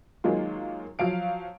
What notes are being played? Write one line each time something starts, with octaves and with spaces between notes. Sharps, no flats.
D#3 F#3 G#3 A#3 F4
F3 F#3 F5 D7